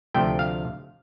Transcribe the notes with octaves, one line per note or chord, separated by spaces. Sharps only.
D2 C3 F3 A3 G5
F5